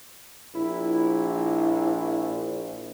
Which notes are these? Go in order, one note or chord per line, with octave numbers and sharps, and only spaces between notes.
A#1 E4